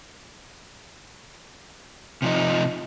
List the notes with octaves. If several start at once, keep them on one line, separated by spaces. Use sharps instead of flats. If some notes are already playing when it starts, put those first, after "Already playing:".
C3 F3 D#4